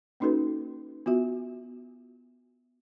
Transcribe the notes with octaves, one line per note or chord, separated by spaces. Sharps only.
A#3 C#4 D#4 F#4 A4 B4
B3 F4 F#4 E5